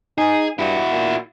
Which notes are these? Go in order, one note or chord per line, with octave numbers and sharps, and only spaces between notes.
D#4 G#4
G2 E4 F#4
A#2